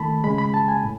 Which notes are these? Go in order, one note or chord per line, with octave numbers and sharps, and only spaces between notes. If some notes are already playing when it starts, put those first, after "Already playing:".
Already playing: D#3 A3 A5 B5
C#3 G#3 B5
B5
A5
G#5
A2